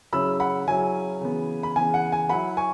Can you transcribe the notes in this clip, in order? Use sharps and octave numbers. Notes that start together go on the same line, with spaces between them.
C#3 F#3 C#4 E4 B5 E6
F#5 B5
C#3 F#3 C#4 E4 G#5
C#3 E3 B3
B5
C#3 E3 B3 G#5
F#5
G#5
F#3 E4 F#5 B5
G#5 C#6